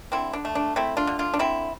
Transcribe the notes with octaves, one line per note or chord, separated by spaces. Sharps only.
D3 C4 E4
D4
A3
D4
A3 C4 E4
D4 F4
D3
D4 F4
D4
D3 C4 E4